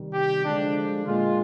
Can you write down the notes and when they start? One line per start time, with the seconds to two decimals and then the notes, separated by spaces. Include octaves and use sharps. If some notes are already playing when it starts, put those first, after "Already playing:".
Already playing: C3 D#3 G3
0.13 G4
0.44 D3 F3 G#3 D4
1.06 A#2 G#3 F4